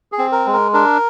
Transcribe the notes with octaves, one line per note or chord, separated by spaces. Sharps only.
G#4
C4
A#4
G#3
A#4
D4 A#4